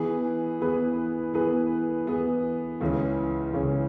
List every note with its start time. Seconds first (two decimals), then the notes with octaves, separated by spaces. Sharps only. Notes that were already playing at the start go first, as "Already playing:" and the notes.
Already playing: E3 B3 G#4 B4
0.60 E3 B3 G#4 B4
1.34 E3 B3 G#4 B4
2.07 E3 B3 G#4 B4
2.81 C#2 C#3 E3 C#4
3.54 C#2 C#3 E3 C#4